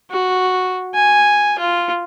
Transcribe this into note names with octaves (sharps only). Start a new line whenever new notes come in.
F#4
G#5
F4